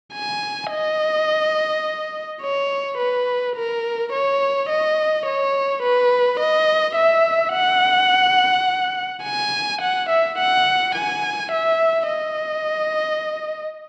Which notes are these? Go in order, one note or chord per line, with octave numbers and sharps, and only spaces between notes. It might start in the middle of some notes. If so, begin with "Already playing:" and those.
G#5
D#5
C#5
B4
A#4
C#5
D#5
C#5
B4
D#5
E5
F#5
G#5
F#5
E5
F#5
G#5
E5
D#5